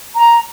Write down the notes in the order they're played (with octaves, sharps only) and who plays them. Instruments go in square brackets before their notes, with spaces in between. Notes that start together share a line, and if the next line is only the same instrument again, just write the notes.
[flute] A#5